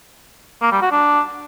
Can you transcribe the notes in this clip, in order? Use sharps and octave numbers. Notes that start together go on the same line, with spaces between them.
A#3
G3
F#4
D4